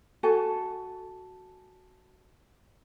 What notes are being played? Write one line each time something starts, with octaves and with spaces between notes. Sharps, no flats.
F#4 A4 G#5